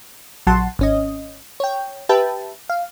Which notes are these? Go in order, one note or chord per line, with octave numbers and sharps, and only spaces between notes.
A#1 F#3 F#5 A5 C6
G#1 C#4 D#5
C#5 G5
G4 B4 E5 G5 A5
F5